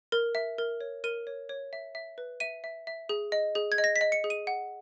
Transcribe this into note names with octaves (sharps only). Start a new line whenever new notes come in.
A#4
E5
A#4
C#5
A#4 D#7
C#5
C#5
E5
E5
B4
E5 D#7
E5
E5
G#4
D#5
G#4
G#6
D#5
A#6
B6
D#5
C#7
G#4
D#7
F#5